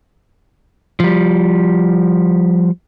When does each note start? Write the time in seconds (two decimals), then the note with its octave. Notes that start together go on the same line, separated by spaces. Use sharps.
1.00 F3 G3